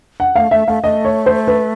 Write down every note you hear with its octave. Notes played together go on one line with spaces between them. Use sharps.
F#5
A3 F5
A3 E5
A3 F5
A3 D#5
C#5
C5
B4